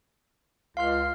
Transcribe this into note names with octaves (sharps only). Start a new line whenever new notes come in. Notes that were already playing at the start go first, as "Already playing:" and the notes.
C#2 F5 C6 F6